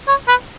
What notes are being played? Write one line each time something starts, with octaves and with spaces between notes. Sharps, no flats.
C#5
B4